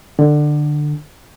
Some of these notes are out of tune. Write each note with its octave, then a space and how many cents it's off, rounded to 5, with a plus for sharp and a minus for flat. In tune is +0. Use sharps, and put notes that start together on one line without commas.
D3 +20